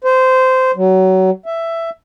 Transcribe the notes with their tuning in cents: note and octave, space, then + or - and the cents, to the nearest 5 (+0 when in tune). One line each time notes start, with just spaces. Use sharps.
C5 -15
F#3 +25
E5 +10